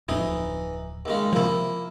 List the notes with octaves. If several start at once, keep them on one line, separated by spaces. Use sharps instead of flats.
D1 F2 E3 D#4
D#2 C#3 G#3
C3 F3 A#3 E4